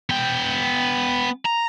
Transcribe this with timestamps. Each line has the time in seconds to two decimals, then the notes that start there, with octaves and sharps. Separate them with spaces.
0.10 B3 G5
1.46 A#5